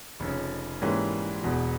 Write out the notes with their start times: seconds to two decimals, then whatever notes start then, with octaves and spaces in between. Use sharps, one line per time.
0.20 F1 F2 C#3
0.82 G#2 E3 G3 A#3 C#4
1.43 E1 E2 B2